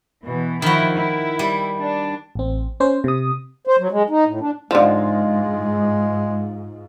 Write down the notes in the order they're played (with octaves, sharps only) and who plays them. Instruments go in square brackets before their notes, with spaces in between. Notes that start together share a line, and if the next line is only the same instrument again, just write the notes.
[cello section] B2 E3
[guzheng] D#3 F#4 [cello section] F3 E4
[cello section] E4
[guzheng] G3
[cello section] D4
[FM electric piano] A1 C4
C#4 C5
C3 D#6
[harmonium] C5
F#3
G#3
D#4
A2
D4
[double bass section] G#2 [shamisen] D3 F3 [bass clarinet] G#3 [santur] D#4 F4